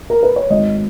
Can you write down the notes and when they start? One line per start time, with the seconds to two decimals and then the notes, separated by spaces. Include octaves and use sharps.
0.10 A#4
0.23 B4
0.36 C#5
0.50 G#1 D#5